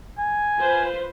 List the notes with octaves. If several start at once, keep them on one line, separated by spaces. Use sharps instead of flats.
G#5
F4 B4 C5